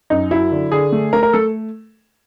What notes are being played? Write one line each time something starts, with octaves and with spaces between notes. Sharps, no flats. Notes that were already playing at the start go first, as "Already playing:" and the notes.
F#2 D#4
F#3 E4
D3
D3 G#4
A3
A3 A#4
A#4
A3 A4